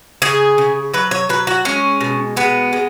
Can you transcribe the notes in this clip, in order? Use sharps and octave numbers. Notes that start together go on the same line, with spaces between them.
C#3 G#4
C#3
F#3 B4
C#5
F#3 B4
F#4
G#3 C#4
B2
G#3 B3
G#3